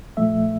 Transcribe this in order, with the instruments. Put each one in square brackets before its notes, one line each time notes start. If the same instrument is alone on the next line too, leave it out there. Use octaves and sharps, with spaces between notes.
[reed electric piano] C2 A#2 F3 A3 E5